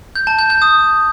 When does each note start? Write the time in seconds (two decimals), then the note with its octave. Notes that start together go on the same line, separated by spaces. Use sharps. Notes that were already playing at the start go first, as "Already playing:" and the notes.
0.16 G6
0.27 A5
0.39 G6
0.50 G6
0.62 D#6